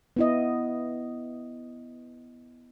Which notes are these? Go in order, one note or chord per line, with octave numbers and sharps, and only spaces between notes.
B3 E4 D#5